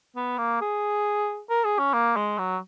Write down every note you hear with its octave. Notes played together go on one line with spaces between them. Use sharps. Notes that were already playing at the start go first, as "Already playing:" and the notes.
B3
A#3
G#4
A#4
G#4
C#4
A#3
G#3
F#3